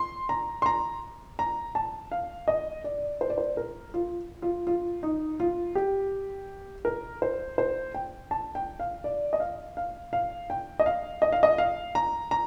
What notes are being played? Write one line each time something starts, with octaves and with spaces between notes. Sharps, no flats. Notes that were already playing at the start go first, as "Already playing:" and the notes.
Already playing: C6
A#5
C6
A#5
A#5
A5
F5
D#5
D5
C5
D5
C5
A#4
F4
F4
F4
D#4
F4
G4
A#4
C5
C5
G5
A5
G5
F5
D5
D#5
F5
F5
F5
G5
D#5
F5
D#5
F5
D#5
F5
A#5
A#5